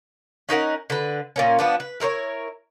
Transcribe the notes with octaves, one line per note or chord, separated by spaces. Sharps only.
C#4 D#4 A#4 F#5
D3 B4
A#2 A#3 C#4
F3 B3 D4
B4
E4 A#4 C5 C#5